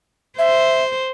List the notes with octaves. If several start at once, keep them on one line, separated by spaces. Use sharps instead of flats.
C5 E5